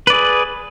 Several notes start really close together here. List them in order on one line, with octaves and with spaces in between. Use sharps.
B4 D5 G#4